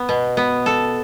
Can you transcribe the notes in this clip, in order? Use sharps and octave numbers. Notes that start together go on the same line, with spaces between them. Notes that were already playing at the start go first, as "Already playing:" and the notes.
Already playing: B3
B2
B3
A4